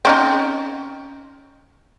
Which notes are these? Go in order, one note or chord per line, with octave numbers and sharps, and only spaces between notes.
C4 C#4 D#4